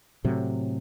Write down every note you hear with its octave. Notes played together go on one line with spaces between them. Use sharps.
A2 C3 F#3